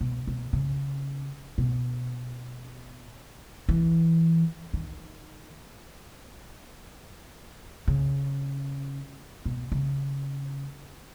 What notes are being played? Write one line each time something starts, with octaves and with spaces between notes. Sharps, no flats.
B2
B2
C#3
B2
E3
D#3
C#3
B2
C#3